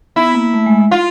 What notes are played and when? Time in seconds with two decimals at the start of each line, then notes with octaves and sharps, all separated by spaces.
0.16 B3 E4
0.35 A#3
0.54 A3
0.66 G#3
0.91 F4